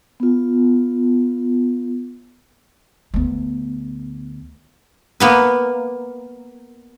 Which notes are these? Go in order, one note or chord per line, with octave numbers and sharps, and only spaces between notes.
B3 F4
D2 B3
A#3 B3 B4